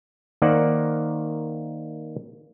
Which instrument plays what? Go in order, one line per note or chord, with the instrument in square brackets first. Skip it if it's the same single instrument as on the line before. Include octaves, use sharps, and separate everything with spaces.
[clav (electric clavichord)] D#3 A#3 C5 D5 F#5